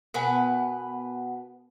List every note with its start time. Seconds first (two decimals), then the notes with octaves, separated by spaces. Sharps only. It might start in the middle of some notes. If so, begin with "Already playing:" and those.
0.14 B2 B3 A#4 B4 F#5 G#5